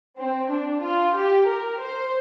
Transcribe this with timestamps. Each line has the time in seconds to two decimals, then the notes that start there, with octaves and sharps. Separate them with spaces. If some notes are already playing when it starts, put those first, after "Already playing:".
0.19 C4
0.51 D4
0.84 F4
1.16 G4
1.48 A#4
1.81 C5